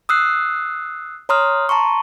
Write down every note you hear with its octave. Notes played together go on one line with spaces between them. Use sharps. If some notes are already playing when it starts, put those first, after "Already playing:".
D#6 E6 F#6 C7
C#5 A#5 C6 D#6 F6
A5 A#5 C6 C#6